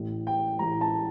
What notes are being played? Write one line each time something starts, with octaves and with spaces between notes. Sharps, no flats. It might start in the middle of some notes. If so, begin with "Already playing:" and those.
Already playing: A1 A2 E3
G5
A1 A2 E3 A#5
A5